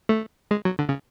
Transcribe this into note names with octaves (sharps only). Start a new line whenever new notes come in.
A3
G#3
F#3
D3
C#3